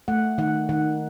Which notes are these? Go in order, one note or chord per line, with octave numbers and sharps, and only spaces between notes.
A3 F#5
D#3 F#5
D#3 F#5